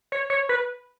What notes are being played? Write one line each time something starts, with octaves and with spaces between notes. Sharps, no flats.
C#5
C#5
B4